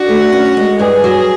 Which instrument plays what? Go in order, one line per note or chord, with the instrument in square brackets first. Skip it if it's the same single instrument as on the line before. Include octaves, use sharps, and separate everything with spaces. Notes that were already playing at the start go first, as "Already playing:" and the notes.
Already playing: [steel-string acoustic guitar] D4 [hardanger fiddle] F#4
[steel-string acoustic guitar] A3
C#4
G#3
[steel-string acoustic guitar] G2 [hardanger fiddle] G#4
[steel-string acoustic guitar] F#3